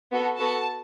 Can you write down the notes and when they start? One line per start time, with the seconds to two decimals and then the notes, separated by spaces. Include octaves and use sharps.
0.11 B3 F#4 A4
0.39 B3 F#4 A4 A5